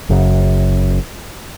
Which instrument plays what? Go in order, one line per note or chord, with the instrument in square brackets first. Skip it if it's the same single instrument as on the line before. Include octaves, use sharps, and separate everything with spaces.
[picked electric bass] F#1 F#2 C#3